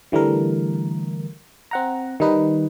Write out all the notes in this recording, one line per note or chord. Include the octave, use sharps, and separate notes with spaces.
D3 E3 G3 A3 A#4
C4 F#5 A#5
D#3 G3 D#4 B4